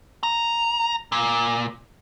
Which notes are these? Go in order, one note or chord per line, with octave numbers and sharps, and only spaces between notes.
A#5
A#2